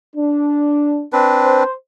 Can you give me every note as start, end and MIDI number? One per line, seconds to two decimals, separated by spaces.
0.16 1.04 62
1.13 1.63 60
1.13 1.63 62
1.13 1.63 71
1.43 1.72 72